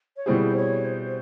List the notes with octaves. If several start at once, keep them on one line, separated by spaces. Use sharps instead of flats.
C#5
B2 G3 C4 E4 G#4 C5
C#5
C5